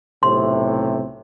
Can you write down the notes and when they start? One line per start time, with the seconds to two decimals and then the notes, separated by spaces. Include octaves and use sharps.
0.23 B1 A2 C3 C6